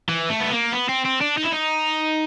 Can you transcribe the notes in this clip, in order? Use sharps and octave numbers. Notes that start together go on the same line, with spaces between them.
E3
A3
B3
A#3
B3
C4
C4
D4
D#4
E4
D#4